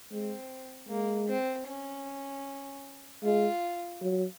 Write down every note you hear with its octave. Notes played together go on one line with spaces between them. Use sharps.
G#3 C4
G#3 A#3
C4
C#4
G#3 F4
F#3